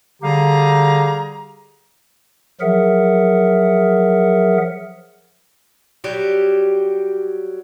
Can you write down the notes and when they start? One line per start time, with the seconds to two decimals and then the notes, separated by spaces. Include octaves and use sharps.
0.22 D3 G3 G4 G#4 F5 A#5
2.61 F3 F#3 G#4 A#4 E5 F#5
6.04 F#3 G3 G4